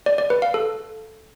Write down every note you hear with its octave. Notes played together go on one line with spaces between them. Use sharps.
D5
D5
B4
F5
A4